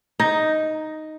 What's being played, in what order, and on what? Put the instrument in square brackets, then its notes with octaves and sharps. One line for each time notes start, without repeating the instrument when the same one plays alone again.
[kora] D#4